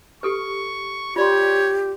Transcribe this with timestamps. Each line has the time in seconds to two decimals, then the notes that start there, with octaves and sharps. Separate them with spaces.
0.23 G4 A4 B4 C#6
1.16 F4 G4 C#5 D5 C6